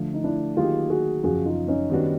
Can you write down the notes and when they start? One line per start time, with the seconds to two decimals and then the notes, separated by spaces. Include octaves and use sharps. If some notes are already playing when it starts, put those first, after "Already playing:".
Already playing: D3 F3 A3
0.14 D#4
0.24 D4 E4
0.57 D#3 F#3 A#3 D#4 F4 G4 G#4
0.90 F#4 G#4
1.23 F#2 C#3 F3 F#4 G#4
1.45 D#4 F4
1.68 C#4 D#4
1.90 D#3 G3 B3 D4 F#4